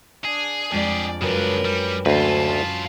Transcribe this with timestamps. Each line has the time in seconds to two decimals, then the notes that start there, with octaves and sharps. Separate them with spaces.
0.25 D4 G#4
0.72 F2 G#3 D4 G4 G#4 D5
1.21 F#2 C#3 D4 A#4 B4 F5 G5
1.65 G3
2.06 D2 C#4 F4 B4 A5